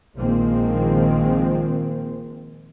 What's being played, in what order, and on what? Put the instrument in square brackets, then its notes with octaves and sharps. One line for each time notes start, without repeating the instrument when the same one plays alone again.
[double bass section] A#1 D#3 F3 G#3 A#3 C4